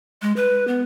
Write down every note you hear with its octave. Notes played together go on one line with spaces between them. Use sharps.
G#3
B4
B3